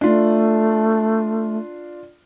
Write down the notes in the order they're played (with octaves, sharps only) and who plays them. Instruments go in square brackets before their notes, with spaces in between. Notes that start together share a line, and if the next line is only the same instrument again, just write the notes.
[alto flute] A3 [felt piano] D4 F4